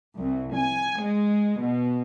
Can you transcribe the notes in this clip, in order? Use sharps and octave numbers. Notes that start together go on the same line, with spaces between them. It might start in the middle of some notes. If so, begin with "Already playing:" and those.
C2
G#5
G#3
B2